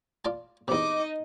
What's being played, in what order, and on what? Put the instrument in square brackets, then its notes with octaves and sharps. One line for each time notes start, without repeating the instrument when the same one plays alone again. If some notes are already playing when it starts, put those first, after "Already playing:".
[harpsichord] F4 D5 A5
[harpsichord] E2 C3 [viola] D#4 D#5 [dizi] D6